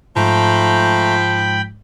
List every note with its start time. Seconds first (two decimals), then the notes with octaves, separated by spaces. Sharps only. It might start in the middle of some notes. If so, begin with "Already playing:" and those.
0.16 G#2 F3 A3 G5 A#5 B5